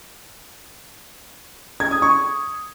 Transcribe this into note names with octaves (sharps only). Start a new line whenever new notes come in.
G#6
D#6
C#6